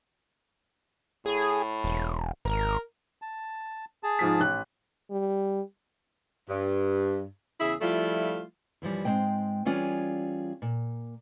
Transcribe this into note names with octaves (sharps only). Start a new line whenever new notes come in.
A2 G#4
E1
G#1 A#4
A5
G#4 A5
G#2 F3 B6
A1 F#6
G3
G2
E2 C#3 E4 G#4 E5
F3 G3 A3 E4 F4
F#2 E3 F3 G3
G#2 F3 G#3 C4 G5
E3 G3 C#4 F4 G#4 D5
A#2